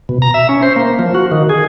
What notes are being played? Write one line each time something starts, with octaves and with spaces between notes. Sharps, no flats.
B2
A#5
E5
C#4
C5
A#3
F3
F#4
D#3
G#4